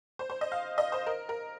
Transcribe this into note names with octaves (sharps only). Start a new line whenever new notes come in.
C5
C5
D#5
F5
D#5
C5
A#4
A#4